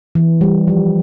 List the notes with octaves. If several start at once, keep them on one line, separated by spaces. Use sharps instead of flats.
E3
G3
F3